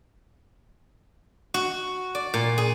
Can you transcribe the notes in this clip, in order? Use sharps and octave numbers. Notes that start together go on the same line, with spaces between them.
F#4
D5
A#2
G#4